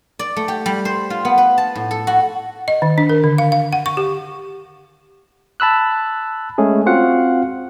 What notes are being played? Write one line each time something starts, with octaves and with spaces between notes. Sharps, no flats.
D5
A3
G4
G3
C5
F4
B3
B4
A5
A2
A4
F#4
D#5
D#3
D4
A#4
D3
F5
F5
F#5
C#6
G4
A5 B5 E6 F#6
G#3 A3 C#4 G#4
C4 F4 F#4 F5 F#5